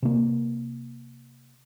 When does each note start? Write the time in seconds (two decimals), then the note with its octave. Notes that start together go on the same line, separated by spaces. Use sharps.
0.02 C3 A#3